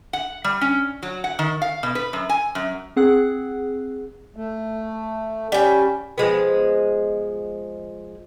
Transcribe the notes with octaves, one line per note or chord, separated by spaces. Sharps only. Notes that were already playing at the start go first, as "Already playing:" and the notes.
F#5
G3
C#4
F#3
F#5
D#3
F5
B2
B4
F#2
G#5
F#2
C4 G#4 F#5 F#6
A3
G3 C#4 G5
F3 G#3 B3